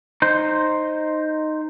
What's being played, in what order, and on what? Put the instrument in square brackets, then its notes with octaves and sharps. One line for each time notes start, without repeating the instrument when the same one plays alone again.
[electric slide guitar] D#4 C5